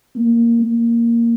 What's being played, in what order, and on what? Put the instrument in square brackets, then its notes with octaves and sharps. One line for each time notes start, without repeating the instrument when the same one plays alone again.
[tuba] A#3
A#3